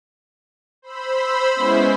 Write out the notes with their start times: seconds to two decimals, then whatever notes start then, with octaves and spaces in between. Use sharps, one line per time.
0.82 C5 B5 E6
1.54 G#3 B3 C#4 E4 C5 E5